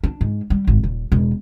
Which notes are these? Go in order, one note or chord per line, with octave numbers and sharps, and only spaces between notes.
D4
G#2
G3
G#1
D#1
E1